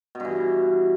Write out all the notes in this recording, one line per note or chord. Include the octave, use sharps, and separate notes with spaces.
G2 B2 E3